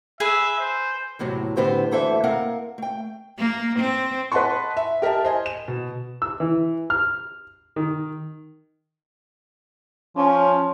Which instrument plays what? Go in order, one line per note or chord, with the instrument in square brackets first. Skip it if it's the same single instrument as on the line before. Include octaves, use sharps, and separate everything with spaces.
[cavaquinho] G#4 B4 G#5 [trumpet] E5
[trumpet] C5
[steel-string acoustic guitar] E2 A2 C3 F#3
A2 D3 B3 C4 G4 C5
D2 D3 E3 A4 C5 E5
A#3 C4 A#4 F5 F#5
A3 G5
[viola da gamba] A#3
C4
[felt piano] B4 D#5 F#5 A5 C6 C#6
E5
G4 A#4 D#5 E5 A5
C5 D#5 G#5
E7
B2
[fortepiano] E6
E3
F6
D#3
[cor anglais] F3 [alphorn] C#4